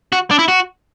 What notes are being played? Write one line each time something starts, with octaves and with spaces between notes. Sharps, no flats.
F#4
D4
E4
F#4